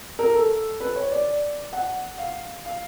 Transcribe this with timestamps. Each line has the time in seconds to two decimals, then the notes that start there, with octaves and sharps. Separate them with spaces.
0.19 A#4
0.34 A4
0.80 B4
0.96 C#5
1.11 D5
1.73 F#5
2.18 F5
2.65 F5